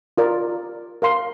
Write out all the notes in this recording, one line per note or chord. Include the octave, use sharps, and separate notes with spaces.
F4 A#4 D5
A#4 F5 C6